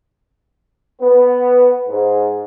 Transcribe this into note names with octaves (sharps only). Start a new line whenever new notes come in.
B3
G#2